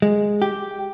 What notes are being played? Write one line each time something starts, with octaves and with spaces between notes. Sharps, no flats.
G#3
G4